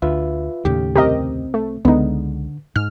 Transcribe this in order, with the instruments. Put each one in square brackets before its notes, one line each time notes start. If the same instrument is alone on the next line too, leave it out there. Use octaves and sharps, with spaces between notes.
[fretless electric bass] D2 [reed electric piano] F4 B4 E5
[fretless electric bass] D#2 A2 C#3 [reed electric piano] G4
[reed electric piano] C2 C4 [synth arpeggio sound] G4 A#4 D#5
[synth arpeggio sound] A3
[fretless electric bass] C#2 G#3 [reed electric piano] D3 [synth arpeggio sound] B3 D#4
[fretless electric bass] G#2 [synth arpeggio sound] F6